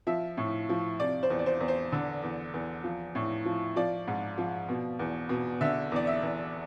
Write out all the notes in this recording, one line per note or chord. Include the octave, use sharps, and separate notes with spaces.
F3 E5
A2
F3
C3 D5
C5
E2
D5
C5
E2
C5
D3
E2
E2
F3
A2
F3
F3 D5
G#2
F3
B2
E2
B2
D3 E5
E2 D5
E5
E2